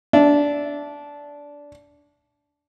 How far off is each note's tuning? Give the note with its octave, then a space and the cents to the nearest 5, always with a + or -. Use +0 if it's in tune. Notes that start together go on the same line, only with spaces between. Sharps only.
D4 -15 E5 +0